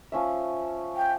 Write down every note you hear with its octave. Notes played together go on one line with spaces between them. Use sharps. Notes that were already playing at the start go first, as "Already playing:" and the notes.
F3 C#4 E5
G5